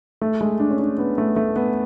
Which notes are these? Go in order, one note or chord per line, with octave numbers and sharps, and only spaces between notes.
A3
G#3
D4
C#4
D4
B3
A3
A3
B3